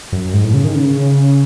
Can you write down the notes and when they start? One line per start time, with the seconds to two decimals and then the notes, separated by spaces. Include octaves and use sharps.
0.13 F#2
0.33 G#2
0.44 A2
0.54 C#3
0.64 D#3
0.75 C#3